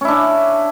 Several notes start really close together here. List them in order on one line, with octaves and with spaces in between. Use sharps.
C#4 E4 D4